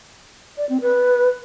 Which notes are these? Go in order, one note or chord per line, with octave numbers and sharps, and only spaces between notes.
D5
C4
B4